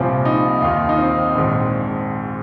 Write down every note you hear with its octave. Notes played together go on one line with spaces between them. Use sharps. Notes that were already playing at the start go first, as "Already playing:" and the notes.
Already playing: C2 A#2 F3 C4
D#4
D#2 D#3 F4
D#4
C4
A#1 G#2 D#3 C4